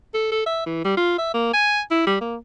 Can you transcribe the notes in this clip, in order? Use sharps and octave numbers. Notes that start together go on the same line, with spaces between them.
A4
A4
E5
E3
G3
F4
E5
A#3
G#5
E4
G3
A#3